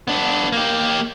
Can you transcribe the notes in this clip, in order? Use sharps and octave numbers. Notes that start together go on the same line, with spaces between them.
B3 D4
A#3 G4